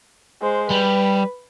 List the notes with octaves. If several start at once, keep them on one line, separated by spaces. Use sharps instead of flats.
G#3 C5
G3 B4